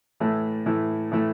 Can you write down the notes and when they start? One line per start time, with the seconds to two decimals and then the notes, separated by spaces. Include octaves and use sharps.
0.20 A2 E3 A3 E4
0.66 A2 E3 A3 E4
1.11 A2 E3 A3 E4